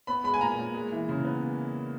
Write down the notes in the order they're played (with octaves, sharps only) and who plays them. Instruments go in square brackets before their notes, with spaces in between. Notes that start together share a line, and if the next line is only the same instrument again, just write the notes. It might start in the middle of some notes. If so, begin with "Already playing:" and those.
[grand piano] B3 B5
G#3 B5
G#5
A#2 A#5
A#2
G#3
E3
C#3
B3